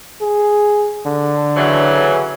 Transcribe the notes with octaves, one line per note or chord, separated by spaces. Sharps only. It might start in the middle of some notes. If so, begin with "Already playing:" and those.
G#4
D3
C#3 E3 F#3